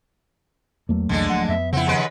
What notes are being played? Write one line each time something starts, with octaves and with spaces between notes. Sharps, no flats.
E2 F#3 A3 A#3
C2 F2 D3 E3 G#3 D4
D1 F3 F#5
F2 B3 E5
C#3 F3 C4 E4 F#5
D#2 G#3 B4